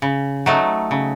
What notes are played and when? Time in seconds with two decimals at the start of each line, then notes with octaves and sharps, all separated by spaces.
0.02 C#3
0.46 F#3 A3 D#4
0.91 C#3